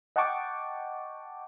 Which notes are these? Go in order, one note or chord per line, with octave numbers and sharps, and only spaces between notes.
D#5 F#5 G5 A5 C#6 D6